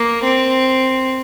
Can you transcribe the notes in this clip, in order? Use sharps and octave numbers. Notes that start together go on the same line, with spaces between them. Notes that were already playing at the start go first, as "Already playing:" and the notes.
Already playing: A#3
C4